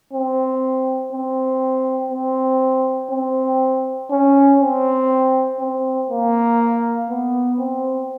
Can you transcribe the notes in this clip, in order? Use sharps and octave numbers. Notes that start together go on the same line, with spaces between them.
C4
C4
C4
C4
C#4
C4
C4
A#3
B3
C4